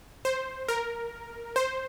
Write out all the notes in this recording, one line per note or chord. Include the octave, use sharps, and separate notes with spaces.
C5
A#4
C5